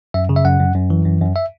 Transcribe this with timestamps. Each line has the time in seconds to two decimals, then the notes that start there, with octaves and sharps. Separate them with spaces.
0.14 F#2 E5
0.29 C#3
0.36 E5
0.45 F#2 F#5
0.60 F#2
0.75 F#2
0.90 E3
1.05 F#2
1.21 F#2
1.36 E5